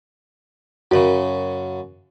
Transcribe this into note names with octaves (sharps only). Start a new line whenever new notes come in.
F#2 C#3 F#4 A#4